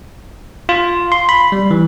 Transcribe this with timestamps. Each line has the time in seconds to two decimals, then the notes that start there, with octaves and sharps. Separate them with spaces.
0.69 F4
1.12 C6
1.29 B5
1.52 G3
1.71 E3